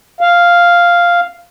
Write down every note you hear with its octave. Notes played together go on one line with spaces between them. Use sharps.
F5